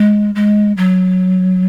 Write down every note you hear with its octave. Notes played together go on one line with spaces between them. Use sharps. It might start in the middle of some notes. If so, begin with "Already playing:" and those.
Already playing: G#3
G#3
F#3